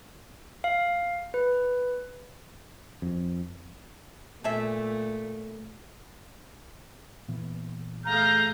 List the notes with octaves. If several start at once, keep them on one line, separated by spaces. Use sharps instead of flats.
F5
B4
F2
A#2 A3 G#4 A4 E5
A#2 E3 B3
A3 G#4 F5 A#5 G6